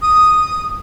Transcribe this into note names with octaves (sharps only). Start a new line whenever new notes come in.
D#6